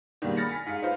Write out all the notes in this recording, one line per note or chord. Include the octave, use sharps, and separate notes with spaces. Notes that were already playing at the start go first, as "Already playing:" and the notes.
G#2 B2 D#3 G3 A#3
B5 F6 A6 A#6 C#7
G#5 B6
G#2 F5 C#7
D#4 F4 B4 C5 F5